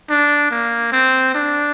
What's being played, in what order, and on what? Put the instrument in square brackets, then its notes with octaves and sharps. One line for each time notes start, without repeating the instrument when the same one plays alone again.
[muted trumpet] D4
A#3
C4
D4